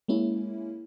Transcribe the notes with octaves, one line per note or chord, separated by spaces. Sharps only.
G#3 A#3 C#4 E4